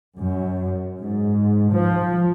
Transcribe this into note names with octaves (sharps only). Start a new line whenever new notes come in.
F#2
G#2
F3